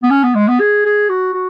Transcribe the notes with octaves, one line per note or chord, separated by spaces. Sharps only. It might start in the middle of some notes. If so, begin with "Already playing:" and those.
B3
C#4
B3
G#3
B3
G#4
G#4
F#4
F#4